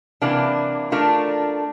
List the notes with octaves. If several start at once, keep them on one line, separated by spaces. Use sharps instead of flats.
C3 E3 A#3 D4
A3 D4 F4 A#4